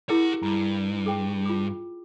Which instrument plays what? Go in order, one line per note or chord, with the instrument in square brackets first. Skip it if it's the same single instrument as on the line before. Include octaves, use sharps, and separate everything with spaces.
[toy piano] E4 G#4 A#4 [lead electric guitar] G4 F#5
[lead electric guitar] G2 [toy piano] A#5
[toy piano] G#4 G5
F4 D6